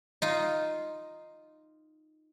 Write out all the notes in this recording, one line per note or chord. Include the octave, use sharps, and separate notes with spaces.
D#4 F4